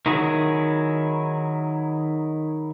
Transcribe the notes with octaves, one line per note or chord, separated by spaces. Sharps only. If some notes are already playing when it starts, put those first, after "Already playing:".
D#3 F#3 E4 G#4